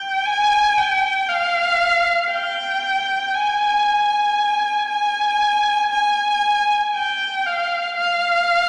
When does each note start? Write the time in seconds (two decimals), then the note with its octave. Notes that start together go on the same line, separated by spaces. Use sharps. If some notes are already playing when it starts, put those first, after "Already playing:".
Already playing: G5
0.26 G#5
0.77 G5
1.29 F5
2.31 G5
3.35 G#5
4.89 G#5
5.92 G#5
6.95 G5
7.46 F5
7.98 F5